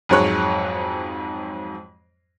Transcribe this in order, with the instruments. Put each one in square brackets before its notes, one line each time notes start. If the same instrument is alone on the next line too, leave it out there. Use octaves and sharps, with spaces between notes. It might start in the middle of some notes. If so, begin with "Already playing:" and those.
[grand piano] F2 G#2 F#3 G#3 C#5 F#6